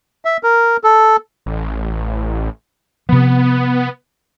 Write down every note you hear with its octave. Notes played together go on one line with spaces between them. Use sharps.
E5
A#4
A4
A1
C3 F3 B3